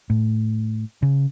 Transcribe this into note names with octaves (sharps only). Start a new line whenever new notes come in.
A2
C#3